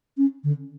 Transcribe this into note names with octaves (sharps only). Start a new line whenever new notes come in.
C#4
D3